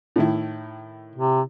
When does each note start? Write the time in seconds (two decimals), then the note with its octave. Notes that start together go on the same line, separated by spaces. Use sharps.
0.16 A2 D#3 E4
1.15 C3